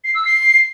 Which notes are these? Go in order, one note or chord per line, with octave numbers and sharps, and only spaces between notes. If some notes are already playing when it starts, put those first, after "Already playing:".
C7
E6
C7